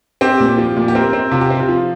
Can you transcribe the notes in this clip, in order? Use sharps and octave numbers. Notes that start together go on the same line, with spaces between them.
C4 G4
A#2
F3
A#2
G4
C4 A#4
C4
C3 F4
G4
C4
F4
F3